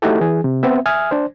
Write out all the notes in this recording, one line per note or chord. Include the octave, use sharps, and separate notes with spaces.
A3 D#4 E4 F#4 G4 A4
E3 G#4
C3
B3 C4 E5
E5 G#5 D#6 F6
D4 C5